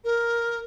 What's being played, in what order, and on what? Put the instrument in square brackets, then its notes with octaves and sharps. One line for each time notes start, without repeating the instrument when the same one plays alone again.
[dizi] A#4